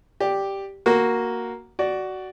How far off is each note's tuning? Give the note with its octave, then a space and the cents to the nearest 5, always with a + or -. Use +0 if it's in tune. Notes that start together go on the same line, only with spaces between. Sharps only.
G4 +0 D5 +0
A#3 +0 F#4 +0 F#5 +0
F#4 +15 D5 +0